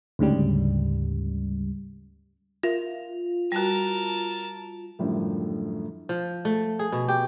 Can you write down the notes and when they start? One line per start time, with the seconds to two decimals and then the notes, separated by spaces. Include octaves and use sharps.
0.19 D2 G#2 C#3 G3
2.63 F4 A#4 E5
3.52 G3 F#4 A#4 A5
4.99 F#2 A2 D3 F3 G3
6.09 F3
6.45 A3
6.79 G#4
6.92 B2
7.08 G4